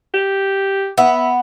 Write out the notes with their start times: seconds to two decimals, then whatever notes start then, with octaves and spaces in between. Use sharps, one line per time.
0.14 G4
0.98 B3 E5